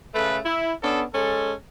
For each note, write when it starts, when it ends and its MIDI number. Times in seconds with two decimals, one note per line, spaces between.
0.14 0.38 49
0.14 0.38 57
0.14 0.38 69
0.14 0.38 71
0.45 0.72 64
0.82 1.03 59
0.82 1.03 61
0.82 1.03 62
0.82 1.03 69
1.14 1.53 56
1.14 1.53 61
1.14 1.53 69